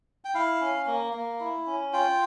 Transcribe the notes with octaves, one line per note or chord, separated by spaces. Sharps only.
G5
E4 F5
C#4
A#3
A#3
E4
C#4
F4 G5